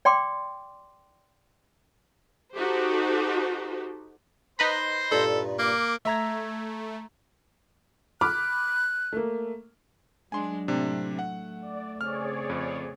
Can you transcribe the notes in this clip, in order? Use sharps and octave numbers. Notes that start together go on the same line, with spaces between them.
D5 G5 C6 D6
D#4 F#4 G4 A4 C5
D#4 B4 C5 B5 C6 A#6
G2 A#2 A4
A#3 D6
A3 E5 A#5 G#6
B5 D6 F6 F#6
A3 A#3
F#3 G#3 D4 G#5 C6
A2 C3 C4 D4
A3 F#5
D5
C#3 C4 G#4 C#5 D5 F6
F2